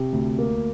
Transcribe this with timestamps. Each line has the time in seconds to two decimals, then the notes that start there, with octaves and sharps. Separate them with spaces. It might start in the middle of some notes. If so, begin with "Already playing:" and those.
Already playing: C3
0.13 D2
0.39 A#3